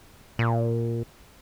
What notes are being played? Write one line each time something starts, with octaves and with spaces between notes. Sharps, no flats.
A#2